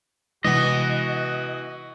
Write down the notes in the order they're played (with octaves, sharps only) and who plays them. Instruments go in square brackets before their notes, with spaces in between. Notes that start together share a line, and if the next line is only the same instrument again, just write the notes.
[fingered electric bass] C3 G#3 [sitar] E3 B3 [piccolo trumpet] F#4 [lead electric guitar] D#5